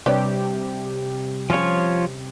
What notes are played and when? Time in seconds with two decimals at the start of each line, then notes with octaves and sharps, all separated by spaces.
0.06 C3 G3 D4 G4 B4 C#5
1.50 C#3 F3 C#4 F4 C#5